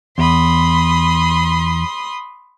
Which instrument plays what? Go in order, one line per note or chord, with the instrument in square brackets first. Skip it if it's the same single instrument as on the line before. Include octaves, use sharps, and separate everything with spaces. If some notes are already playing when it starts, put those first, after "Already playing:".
[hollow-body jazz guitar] E2 [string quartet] B5 C6 D#6